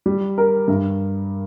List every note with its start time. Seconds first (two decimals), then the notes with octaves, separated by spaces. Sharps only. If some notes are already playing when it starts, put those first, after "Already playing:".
0.06 G3
0.38 A#4
0.68 G2